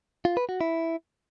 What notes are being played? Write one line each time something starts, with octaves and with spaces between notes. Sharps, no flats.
F4
B4
F#4
E4